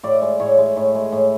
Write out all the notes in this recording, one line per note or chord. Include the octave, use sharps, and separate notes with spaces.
A2 D5
G#3
A2 C#5
G#3
A2
G#3
A2